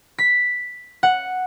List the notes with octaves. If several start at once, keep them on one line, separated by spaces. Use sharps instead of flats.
B6
F#5